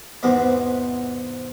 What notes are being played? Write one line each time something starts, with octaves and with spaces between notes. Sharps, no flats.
E2 G#2 C3 B3